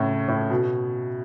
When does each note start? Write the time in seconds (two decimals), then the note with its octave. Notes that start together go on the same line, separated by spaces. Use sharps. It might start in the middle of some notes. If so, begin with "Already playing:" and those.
Already playing: A2 C#3
0.28 A2
0.50 B2